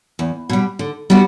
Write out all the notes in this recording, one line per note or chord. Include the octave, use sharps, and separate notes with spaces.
E2
B2 G3
D3
G3 B3 D4 F#4